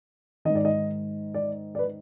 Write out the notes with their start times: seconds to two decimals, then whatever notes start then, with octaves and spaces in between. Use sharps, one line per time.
0.45 D#3 D#5
0.50 G#2
0.55 D5
0.65 D#5
1.34 D5
1.75 D5
1.79 B4